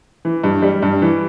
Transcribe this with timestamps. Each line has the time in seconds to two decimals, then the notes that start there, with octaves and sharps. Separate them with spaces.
0.25 E3
0.44 G2
0.62 G3
0.82 G2
1.02 E3